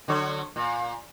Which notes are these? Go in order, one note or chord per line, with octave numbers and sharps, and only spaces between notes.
D3 F#3 C#5
A#2